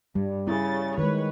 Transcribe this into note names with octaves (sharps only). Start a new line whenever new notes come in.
G2 G3
C#3 E4 A6
D#3 G#3 B4 C#5